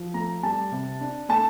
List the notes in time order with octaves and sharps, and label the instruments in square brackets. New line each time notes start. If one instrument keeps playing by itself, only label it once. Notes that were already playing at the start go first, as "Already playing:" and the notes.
Already playing: [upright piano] F3
A3 A#5
G3 A5
C3
D4
A3 A5